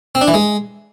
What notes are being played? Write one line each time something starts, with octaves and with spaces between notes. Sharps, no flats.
C4
D4
E3
G#3